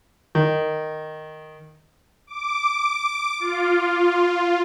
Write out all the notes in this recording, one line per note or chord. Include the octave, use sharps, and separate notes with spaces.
D#3
D6
F4